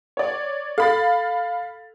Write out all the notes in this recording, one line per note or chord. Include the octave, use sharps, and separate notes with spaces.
C#5 D5
A4 F5 B5 A6